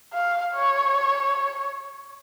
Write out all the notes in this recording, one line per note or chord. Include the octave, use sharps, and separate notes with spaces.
F5
C#5